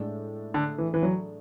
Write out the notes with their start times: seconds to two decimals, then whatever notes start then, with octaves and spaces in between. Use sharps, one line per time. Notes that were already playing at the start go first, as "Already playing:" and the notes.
Already playing: A2 G#3 D4 A4
0.54 D3
0.78 E3
0.94 E3
1.03 F#3